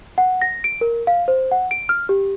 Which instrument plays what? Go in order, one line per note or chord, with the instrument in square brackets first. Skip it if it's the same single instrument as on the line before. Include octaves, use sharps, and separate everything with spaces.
[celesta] F#5
A#6
D7
A#4
F5
C5
F#5
D7
F6
G4